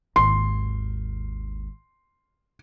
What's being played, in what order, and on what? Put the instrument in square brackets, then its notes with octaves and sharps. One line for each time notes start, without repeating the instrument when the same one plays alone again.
[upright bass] G#1 D#2 [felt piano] C6